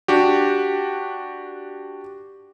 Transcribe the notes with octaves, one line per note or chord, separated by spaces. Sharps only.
D4 F#4 G4